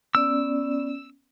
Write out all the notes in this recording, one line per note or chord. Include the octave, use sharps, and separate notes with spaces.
B3 C#4 D5 E6